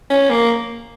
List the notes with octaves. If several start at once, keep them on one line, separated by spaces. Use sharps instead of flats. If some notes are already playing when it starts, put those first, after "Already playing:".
C#4
A#3